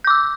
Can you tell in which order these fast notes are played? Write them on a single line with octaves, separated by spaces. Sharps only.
G6 D6 E6